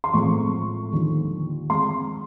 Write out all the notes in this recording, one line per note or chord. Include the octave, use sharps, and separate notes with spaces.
C6
A2 F3 G#3 C4 C#6
D#2 D3 F3
G#3 C4 C6